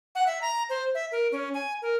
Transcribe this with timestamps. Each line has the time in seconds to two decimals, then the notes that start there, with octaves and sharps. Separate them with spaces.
0.15 F#5
0.27 E5
0.41 A#5
0.70 C5
0.95 E5
1.12 A#4
1.32 C#4
1.54 G#5
1.82 A#4